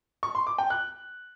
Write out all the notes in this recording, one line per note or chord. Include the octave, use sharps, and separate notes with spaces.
C#6
C6
D6
G5
F#6